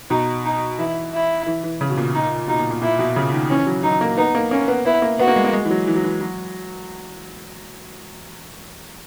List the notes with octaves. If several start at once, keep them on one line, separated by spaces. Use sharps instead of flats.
B2 D#4
D#4
E3 E4
E4
E3
E3
C#3
B2
A#2
D#4
B2 D#4
A#2
A#2
A#2 E4
B2
C#3
D#3
E3 C#4
F#3
F#3 D#4
A#3
B3 D#4
A#3
A#3 C#4
B3
B3 E4
A#3
B3 F#4
A#3
G#3
A#3
G#3
E3
F#3
E3
F#3
E3
F#3